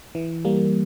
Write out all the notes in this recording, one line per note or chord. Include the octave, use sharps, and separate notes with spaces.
E3
G3 A#3